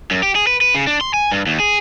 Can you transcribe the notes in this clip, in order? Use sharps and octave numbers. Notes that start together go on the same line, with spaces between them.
F#2
G4
G#4
B4
B4
C#3
D4
C6
G#5
G2
D#2
G#4